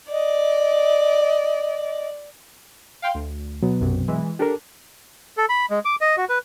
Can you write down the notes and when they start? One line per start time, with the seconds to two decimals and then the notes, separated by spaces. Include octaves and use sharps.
0.12 D5 D#5
3.02 F5 G5 C6
3.14 D2
3.62 B2 F#3 B3
3.80 B1 F#2 C3
4.08 E3 G#3
4.39 D4 G4 A4 A#4
5.37 A4
5.49 B5
5.70 G#3
5.85 D6
6.01 D#5
6.17 F#4
6.29 B4